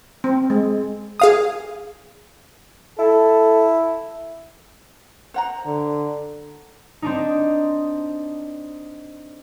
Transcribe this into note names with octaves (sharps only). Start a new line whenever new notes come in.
C4
G#3
G#4 F5 D#6
E4 A4
C5 F#5 A#5
D3
C4 D4 D#4